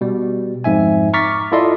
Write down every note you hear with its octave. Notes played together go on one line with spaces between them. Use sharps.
B2 G3
F2 G#2 E5 G#5
A#5 C#6 D6 F6 A6 B6
E4 F4 A4 D5 D#5 C6